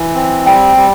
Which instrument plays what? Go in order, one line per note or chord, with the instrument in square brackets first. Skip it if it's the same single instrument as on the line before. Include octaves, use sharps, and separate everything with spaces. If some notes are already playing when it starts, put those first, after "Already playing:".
Already playing: [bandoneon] E3
C4
[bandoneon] G3 [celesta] G5
[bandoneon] G3